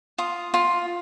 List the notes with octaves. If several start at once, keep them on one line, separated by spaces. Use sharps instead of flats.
F4 D#6
F4